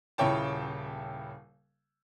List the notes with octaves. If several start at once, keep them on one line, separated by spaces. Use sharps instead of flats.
D#1 C#3 E4 C#5 G5 A5